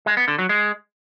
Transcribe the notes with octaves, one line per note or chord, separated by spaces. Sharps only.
G#3
B3
D3
F#3
G#3